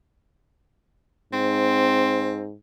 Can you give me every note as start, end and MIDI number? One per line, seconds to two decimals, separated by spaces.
1.33 2.55 44
1.33 2.46 60